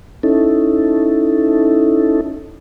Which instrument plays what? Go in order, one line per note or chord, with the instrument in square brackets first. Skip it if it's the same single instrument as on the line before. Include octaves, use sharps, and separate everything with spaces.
[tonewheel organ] C#4 D#4 E4 A4